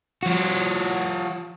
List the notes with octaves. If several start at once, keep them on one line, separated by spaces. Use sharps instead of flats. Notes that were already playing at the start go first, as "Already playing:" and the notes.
F3 F#4